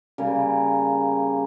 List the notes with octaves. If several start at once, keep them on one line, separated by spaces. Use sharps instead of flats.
C#3 G3 A#3